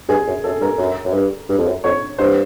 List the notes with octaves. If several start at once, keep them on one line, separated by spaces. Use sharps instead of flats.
G2 G#4
F#2
F#2 A4
G2 A#4
F#2
F#2
G2
G2
F2
F#2
F2 C#5
G2 C5